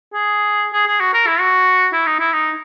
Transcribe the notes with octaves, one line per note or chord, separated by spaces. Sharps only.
G#4
G#4
G#4
F#4
A#4
E4
F#4
E4
D#4
E4
D#4